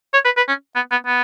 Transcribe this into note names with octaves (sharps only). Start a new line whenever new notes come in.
C#5
B4
B4
C#4
B3
B3
B3